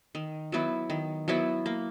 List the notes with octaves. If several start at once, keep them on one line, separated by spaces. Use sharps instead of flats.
D#3
F#3 B3 E4
D#3
F#3 B3 E4
A#3